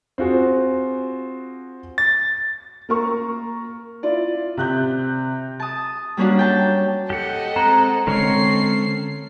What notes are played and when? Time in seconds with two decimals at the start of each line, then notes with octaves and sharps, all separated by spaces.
0.18 C4 F4 F#4 G#4
1.98 A6
2.89 A#3 A#4 C#6
4.03 E4 F4 D5
4.57 C3 F#6 G6
5.60 A5 D#6
6.17 G3 A#3 C#4 D4 F#4
6.39 G5 A5
7.10 G4 A4 D#5 F#5
7.56 G#3 C4 F#5 A#5
8.07 D3 G#3 C4 C#4 A4 A#4 C#5 C7